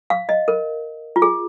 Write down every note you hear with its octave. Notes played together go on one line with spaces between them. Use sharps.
F5
D#5
A#4
F4
G#4